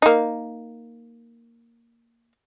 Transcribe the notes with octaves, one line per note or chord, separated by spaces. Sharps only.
A#3 D#4